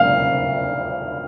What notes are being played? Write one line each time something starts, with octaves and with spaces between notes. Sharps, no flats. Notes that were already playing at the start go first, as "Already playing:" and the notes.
Already playing: F5